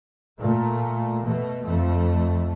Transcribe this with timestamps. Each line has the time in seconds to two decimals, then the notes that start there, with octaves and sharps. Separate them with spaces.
0.38 A#2 A3
1.24 B2 A3
1.63 F2 A3